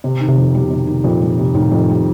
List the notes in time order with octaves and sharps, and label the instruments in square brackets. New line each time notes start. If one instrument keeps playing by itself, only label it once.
[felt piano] C3
D#3
[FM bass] C3
[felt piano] F2
[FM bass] B2 [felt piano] G3
[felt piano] C3
D#3
[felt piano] F2 [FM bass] A#2
[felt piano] G3
C3
[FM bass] A2 [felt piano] D#3
[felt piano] F2
G3